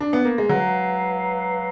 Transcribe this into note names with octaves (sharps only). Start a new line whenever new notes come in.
D4
B3
A#3
G#3
F#3 B4 F5 A#5